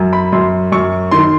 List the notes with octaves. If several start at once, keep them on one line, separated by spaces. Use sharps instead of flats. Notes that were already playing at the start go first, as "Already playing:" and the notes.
Already playing: F#2
B5
F#2 C6
F#2 C#6
D#3 C6
C6